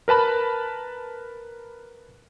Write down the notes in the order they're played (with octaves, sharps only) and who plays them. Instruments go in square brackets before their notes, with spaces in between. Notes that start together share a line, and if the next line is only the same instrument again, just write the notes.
[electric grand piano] A#4 B4 A5 B5